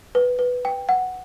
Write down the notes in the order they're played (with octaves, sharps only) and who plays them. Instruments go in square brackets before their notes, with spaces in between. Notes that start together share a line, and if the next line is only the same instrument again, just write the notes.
[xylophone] B4
B4
G5
F#5